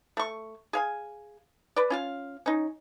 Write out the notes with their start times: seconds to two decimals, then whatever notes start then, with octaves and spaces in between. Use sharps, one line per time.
0.17 A3 C#6
0.73 G#4 F5 G#5
1.76 B4 D5
1.90 C#4 F4 F5
2.46 C#4 D#4